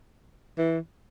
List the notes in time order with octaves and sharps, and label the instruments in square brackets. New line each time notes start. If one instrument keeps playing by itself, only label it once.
[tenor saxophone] E3